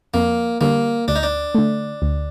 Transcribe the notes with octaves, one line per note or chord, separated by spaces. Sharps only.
F2 A#3
D3 G3 A#3
D2 D4
D#4
D4
D3 A3
D2